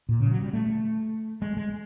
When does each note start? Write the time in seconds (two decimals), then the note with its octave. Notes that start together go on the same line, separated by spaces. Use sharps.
0.09 A#2
0.20 C#3
0.27 F3
0.31 F#3
0.42 G3
0.53 A3
1.42 G#3
1.57 G#3